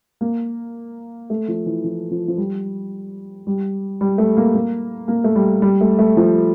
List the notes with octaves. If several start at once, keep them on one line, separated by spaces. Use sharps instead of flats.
A#3
A3
F3
E3
F3
F3
F3
G3
G3
G3
A3
A#3
A#3
A#3
A3
G3
G3
A3
A3
F3